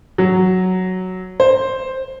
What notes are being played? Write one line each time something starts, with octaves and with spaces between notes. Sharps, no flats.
F#3
C5